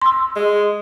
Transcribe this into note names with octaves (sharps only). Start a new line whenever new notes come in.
C6 E6
G#3